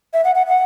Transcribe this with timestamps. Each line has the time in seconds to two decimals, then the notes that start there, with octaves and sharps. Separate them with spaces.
0.14 E5
0.24 F#5
0.35 F#5
0.47 F#5